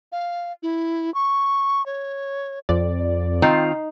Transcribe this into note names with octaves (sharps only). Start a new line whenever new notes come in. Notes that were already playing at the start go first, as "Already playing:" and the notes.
F5
E4
C#6
C#5
F2 D5
D#3 C4 D#4 F4